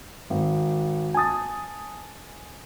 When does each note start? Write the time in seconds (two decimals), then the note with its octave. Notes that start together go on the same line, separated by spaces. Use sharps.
0.30 G#1
1.14 G#5 A5 D#6 A6